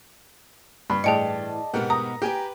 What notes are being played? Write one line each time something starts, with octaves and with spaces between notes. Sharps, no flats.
G2 B5
A2 E3 G#4 D5 D#5 G5 A5 C#7
G#2 B2 B3 G4 A#4 F#5
A#5 D#6
G4 B4 G5 G#5